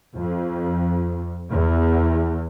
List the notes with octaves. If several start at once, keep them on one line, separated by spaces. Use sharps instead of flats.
F2
E2